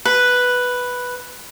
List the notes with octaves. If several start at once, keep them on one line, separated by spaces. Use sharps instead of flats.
B4